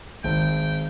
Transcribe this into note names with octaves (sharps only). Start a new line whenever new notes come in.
G#1 G5